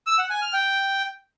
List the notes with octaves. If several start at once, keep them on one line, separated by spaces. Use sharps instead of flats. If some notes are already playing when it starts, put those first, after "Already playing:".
E6
F#5
G#5
F6
G5